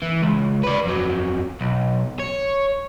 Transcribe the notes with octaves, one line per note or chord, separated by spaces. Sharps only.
E3
C#2
B4 D5
F2 F#3
B1
C#5